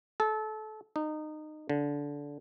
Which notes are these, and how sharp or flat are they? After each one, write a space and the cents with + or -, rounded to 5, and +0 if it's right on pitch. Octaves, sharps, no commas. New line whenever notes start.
A4 -25
D#4 -20
D3 -20